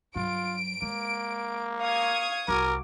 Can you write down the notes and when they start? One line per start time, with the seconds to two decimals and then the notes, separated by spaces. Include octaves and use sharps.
0.16 G2 F#3 F4 D7
0.82 G#3 A#3
1.80 F5 C#6 D#6 G#6
2.48 C2 F4 F#4 A#4 D6